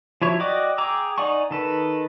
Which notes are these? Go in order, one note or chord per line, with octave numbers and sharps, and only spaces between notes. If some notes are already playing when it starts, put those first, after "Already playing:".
F3 F#3 E4 C#5
F#4 D5 D#5 G5 D6
G#4 G5 A#5 D6 E6
D#4 D5 F#5 G#5 C#6
D#3 A4 B4